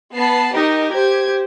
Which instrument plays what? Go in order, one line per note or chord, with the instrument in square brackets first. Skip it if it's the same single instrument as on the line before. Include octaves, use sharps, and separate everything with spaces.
[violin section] B3 A5 C7
[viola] D#4 [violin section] G4 A#4 D#5
[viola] G4 C5 [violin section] G#6